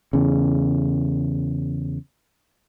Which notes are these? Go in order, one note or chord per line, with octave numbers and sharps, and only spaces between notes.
E2 C#3